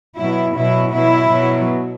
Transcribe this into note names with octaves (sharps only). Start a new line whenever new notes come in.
B2 F#3 E4
B2 F#3 E4
B2 F#3 E4
B2 F#3